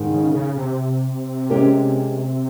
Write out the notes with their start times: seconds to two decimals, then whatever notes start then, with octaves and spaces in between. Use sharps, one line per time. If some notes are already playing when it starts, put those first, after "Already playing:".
Already playing: G#2 D#3 G#3 D#4
0.11 C#3
0.34 C#3
0.57 C3
1.50 G#3 C#4 G4 A#4